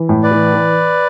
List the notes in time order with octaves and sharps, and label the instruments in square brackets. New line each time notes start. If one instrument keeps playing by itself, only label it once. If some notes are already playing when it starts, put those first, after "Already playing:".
Already playing: [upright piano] E3
A2
[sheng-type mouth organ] B4 D5
[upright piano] E3
E3